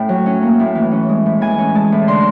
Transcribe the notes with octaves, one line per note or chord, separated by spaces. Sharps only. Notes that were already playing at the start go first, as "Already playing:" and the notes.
Already playing: A2 C#4 G5
F#3
C#4
A#3
A2
E3
C#4
G#3
A2
E3 G#5
C#4
G#3 A5
A2
D3 C6